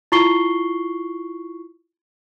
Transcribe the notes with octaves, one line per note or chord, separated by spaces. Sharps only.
E4 F4 C#6 C7 G7